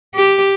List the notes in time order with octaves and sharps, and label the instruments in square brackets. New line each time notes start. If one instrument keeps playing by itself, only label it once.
[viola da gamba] G4